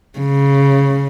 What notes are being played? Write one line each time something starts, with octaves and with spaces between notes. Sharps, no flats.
C#3